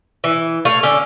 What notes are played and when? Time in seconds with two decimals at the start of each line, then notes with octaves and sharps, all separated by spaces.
0.24 E3
0.65 A3 C#5 F5
0.83 D3 C#4